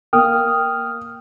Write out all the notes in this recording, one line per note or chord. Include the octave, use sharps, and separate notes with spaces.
A#3 G5 D#6 F6